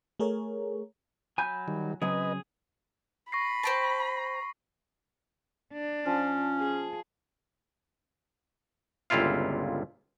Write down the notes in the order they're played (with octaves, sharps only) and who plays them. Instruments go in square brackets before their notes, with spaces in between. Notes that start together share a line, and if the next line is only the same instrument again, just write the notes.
[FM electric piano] A3 G#4 A#4 C#5
[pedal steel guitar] F#3 B5 G6 [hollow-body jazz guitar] G#5
[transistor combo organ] D#3 G3
[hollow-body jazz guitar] C#3 F#3 C4 [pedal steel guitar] G#4 [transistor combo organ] B4 D#5
[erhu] B5 [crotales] C#6 A#6 C7
[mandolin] C5 G5 A5
[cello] D4
[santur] F3 [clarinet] C#4
[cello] G#4
[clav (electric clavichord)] G1 C#2 A#2 E4 F4 F5